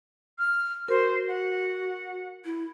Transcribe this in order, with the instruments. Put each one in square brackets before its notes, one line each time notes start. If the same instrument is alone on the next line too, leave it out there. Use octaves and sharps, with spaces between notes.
[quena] F6
[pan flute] F#4 [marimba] A#4 [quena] C5
[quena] F#5
[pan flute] E4